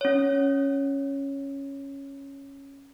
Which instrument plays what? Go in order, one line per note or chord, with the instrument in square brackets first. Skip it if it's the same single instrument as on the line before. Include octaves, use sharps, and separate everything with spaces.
[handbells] C#4 C#5